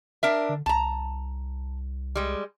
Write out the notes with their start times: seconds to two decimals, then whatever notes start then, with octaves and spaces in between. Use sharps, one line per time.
0.23 D4 A#4 E5
0.49 D3
0.66 C2 A5 A#5
2.16 G3 G#3